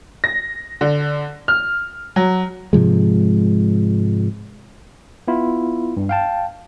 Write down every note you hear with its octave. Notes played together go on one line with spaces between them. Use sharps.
A#6
D3
F6
F#3
G#2 C3 F3 G#3
B3 E4 F4
G2
F5 G5 A5